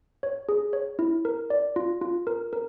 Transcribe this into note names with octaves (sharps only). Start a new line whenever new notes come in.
C#5
G#4
C#5
E4
A#4
D5
F4
F4
A#4
A#4